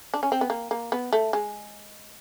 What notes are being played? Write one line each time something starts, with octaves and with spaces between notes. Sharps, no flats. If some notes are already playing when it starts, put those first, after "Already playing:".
D4
C#4
C4
B3
A#3
A#3
B3
A3
G#3